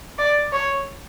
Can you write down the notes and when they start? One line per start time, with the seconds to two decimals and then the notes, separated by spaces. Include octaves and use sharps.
0.19 D5
0.53 C#5